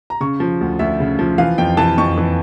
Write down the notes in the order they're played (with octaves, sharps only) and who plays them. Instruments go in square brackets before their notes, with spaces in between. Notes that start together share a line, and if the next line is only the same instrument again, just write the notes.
[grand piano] A#5
C#3 C#6
F3
D2
D2 E5
C#3
F3
E3 F5
F2 G5
E3 A5
F2 C#6
E3